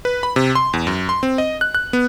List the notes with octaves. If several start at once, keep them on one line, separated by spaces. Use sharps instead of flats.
B4
B5
C3
C6
E2
F#2
C6
C4
D#5
F#6
F#6
B3